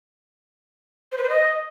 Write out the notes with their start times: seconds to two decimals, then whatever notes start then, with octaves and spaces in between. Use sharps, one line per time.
1.12 C5
1.18 B4
1.23 C5
1.29 D#5